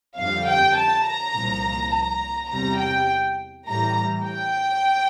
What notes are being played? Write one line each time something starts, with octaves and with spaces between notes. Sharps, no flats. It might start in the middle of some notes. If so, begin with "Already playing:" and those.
F2 D3 G3 F5
G5
A5
A#5
C2 A#2 F3
A#5
E2 C3 G3 A#5
G5
A2 E3 G3 A#5
G5